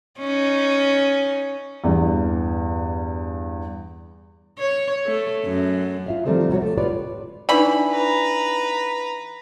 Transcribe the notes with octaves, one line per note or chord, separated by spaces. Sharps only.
C#4 D#4
E2 G2
C#5
A3
F#2
F4 E5 F5
D#3 F3 G3 A3 C4 F4
C3 E4 F#4 C#5
A3
F4 G4 B4 C#5 D5
E3 D4 D#4 D5 B5
B4 A#5